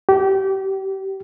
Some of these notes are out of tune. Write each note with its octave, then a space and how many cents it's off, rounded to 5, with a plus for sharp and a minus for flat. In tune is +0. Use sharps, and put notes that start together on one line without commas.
G4 -30